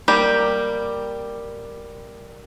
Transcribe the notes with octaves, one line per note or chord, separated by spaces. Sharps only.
G3 A#3 G4